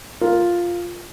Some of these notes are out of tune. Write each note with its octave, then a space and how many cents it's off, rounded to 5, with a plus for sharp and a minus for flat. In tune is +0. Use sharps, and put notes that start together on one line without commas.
F4 +0 A#4 +0